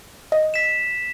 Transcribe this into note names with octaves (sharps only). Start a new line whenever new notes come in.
D#5
B6 E7